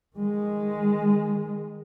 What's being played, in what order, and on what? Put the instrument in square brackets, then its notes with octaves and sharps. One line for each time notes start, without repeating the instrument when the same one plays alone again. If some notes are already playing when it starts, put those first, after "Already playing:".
[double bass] D#3 G#3